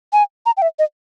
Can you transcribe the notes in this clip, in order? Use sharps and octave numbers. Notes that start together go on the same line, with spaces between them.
G#5
A#5
G5
E5
D#5